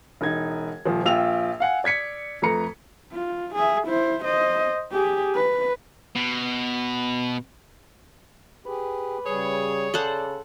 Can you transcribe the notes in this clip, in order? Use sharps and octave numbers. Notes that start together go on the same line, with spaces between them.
E1 D#4 G#6
D#1 F3
A#1 F4 G5 E6 F7
F5 F#5 G#5
D5 G#6 B6 C#7
F2 A3 B4 A#5 C#7
F4
G#4 E5
E4 C5
C5 D#5
G4 G#4
B4
B2
G4 G#4 B4
C#3 G3 G#4 C#5
C#3 A4 C5 D5 F#5